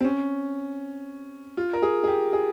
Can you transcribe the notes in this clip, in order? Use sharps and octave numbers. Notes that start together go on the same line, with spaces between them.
C4
C#4
F4
A#4
G#4
G#4
G4
G#4